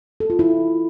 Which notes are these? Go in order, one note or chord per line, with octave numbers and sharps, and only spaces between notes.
A4
F4
E4